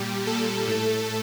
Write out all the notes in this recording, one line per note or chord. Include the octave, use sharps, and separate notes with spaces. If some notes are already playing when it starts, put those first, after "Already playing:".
Already playing: A#2 G3 G4
A#2 G3 A4
A2 A3